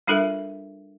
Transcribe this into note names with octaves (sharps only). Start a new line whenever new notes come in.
G3 D4 F4 A4 A#4 E5